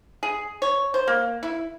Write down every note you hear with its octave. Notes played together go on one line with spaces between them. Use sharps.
G#4
C#5
C5
A#3
E4